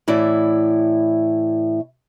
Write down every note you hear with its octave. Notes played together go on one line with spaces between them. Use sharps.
A2 E3 E4 D5